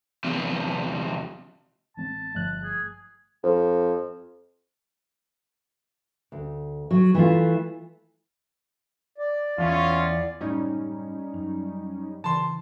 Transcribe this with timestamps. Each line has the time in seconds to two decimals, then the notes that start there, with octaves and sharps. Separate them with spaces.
0.24 E2 C3
1.97 A1 G#3 C4 A5
2.35 G1 G2 F3 A3 F#6
2.64 G#4
3.43 F2
6.32 D2
6.91 F#3
7.14 E3 A3 F4
9.18 D5
9.58 E2 C#4 F4
10.41 F#1 A2 G3 C#4 D#4
11.34 F#2
12.24 C#3 E3 A5 C6